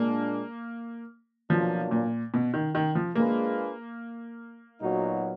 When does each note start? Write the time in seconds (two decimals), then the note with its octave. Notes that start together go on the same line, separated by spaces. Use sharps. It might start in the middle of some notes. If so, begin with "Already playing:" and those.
Already playing: A#2 G#3 A#3 D4
1.50 B2 F3 F#3 A#3 D4 F4
1.91 A#2
2.34 B2
2.54 D#3
2.75 D#3
2.95 F3
3.15 G#3 A#3 D4 F4 G#4 B4
4.81 A#2 F#3 B3 D#4 F#4